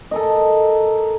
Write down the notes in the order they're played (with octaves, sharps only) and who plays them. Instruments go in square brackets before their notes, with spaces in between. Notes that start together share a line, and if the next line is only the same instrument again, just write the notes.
[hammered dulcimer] A4 A#4 D#5